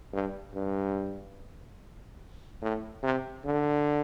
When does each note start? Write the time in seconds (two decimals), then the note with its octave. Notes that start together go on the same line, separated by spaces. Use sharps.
0.13 G2
0.55 G2
2.62 A2
3.03 C3
3.45 D3